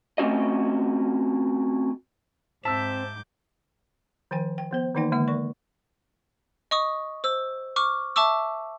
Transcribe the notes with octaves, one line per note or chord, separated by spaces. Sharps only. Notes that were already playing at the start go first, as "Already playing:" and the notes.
A3 C4 C#4 F#4 D#5
G#2 C4 E5 A5 D6 E6 G6
D#3 F3 G5 G#5
G5
F3 B3 C5
D#3 E3 A#3 D#4 D5 G5
D3 G#3 A#3 E5
A#4 D5 C#6
D#5 C#6 D#6
C5 E6
C#6 D6 F6
E5 A5 C#6 D6 E6